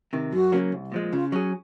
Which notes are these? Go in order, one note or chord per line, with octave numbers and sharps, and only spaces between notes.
C3 D#3
F#2 F#4
C#3 F#3 A#3 C#4
C2
A#2 F3 G#3
C#3 F4
F#3 C#4 G#4